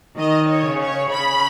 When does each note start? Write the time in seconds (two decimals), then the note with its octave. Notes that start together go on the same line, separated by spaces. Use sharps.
0.17 D#3 D#5
0.49 C#5
0.65 C#3
0.81 C#5
1.12 C#3 B5